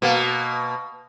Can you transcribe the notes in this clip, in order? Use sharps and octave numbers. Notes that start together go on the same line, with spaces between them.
B2 A#3